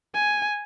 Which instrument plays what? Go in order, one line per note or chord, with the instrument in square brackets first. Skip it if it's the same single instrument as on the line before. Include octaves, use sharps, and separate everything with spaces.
[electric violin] G#5